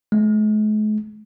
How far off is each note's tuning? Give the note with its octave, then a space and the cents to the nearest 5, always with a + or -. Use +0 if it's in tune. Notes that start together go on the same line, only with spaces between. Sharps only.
G#3 +45